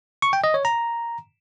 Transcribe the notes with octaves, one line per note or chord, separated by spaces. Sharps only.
C#6
G5
D#5
C#5
A#5